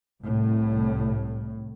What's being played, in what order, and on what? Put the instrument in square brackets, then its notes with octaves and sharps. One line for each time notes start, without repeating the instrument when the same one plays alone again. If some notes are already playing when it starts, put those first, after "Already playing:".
[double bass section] C2 A2